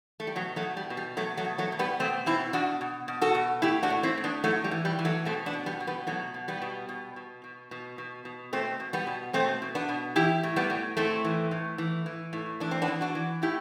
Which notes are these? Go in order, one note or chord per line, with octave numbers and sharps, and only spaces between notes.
A3
G3
B2 F#3
F#3 A3
B2
G3
B2
G3
B2 F#3 A3
F#3 A3
B2
F#3 A3
B2
G3 B3
B2 A3 C4
B2 C4 E4
B2 D4 F#4
B2
B2
F#4 A4
B2
A2 E4 G4
D4 F#4
A2
C4 E4
A2
B3 D4
A2 F#3 A3
G3
E3
G3
E3
F#3 A3
B2 A3 C4
B3 D4
B2
G3 B3
B2
G3 B3
B2 F#3 A3
B2
G3 B3
B2
B2
B2
B2
B2
B2
B2
B2 A3 C4
B2
G3 B3
B2
B2 A3 C4
B2
B3 D4
B2
E3 E4 G4
A2
G3 B3
A2
A2 A3 C4
E3
A2
E3
E3
A2
E3 D4
C4
B3 D4
E3
D4 F#4
E3
A2 E4 G4